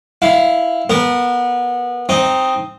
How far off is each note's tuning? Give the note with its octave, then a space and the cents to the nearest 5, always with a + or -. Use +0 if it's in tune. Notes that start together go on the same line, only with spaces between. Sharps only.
E4 +0 F5 +0
B3 -25 A#4 -20
C4 +0 D#4 +0